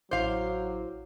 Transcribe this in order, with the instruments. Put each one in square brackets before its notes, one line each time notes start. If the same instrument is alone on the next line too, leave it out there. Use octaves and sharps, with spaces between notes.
[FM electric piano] A1 E4 D6 [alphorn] F#3 [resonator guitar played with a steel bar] C5 F5